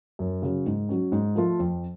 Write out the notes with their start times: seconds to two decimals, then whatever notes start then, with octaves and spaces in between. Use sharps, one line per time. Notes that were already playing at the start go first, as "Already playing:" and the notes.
0.19 F#2
0.42 C#3 F#3
0.66 G#2
0.89 F#3 C#4
1.12 G#2
1.36 F3 A3 F4
1.59 F2